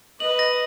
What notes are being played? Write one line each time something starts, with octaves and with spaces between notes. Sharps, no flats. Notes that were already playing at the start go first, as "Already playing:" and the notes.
B4 D#5 F#7
A#6